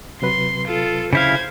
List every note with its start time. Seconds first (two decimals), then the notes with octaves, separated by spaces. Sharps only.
0.22 C3 F#3 B4 C6
0.66 F4 A4
1.13 C#3 E4 C5 F5 G#6